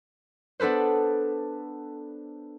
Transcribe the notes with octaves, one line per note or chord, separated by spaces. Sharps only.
B3 D4 A4 B4 C5